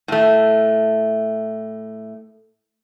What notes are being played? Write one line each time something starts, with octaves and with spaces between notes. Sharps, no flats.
A2 A3